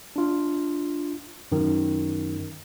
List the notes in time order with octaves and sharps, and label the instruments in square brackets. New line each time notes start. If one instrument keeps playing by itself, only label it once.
[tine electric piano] D4 F4
F#2 D#3